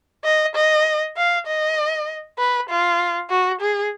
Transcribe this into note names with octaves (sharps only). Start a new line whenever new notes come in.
D#5
D#5
F5
D#5
B4
F4
F#4
G#4